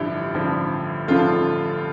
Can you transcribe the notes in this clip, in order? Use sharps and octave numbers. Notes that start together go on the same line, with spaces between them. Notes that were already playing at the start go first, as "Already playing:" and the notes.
Already playing: A1 G2 D3 F3 E4 G4
A1 G2 D3 F3
A1 G2 D3 F3 F4 A4